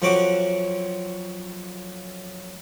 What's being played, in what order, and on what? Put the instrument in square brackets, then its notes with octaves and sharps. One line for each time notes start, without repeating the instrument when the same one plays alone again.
[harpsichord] F2 F3 F#3 F#4 D6